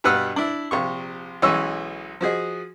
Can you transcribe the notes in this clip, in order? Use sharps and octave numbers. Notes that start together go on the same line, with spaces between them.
G2 B2 B4 F#5 E6 F6
D4 E4
A#1 C3 C#6
B1 E3 G#3 C#4 C#6 E6
F3 F#4 G#4 D#5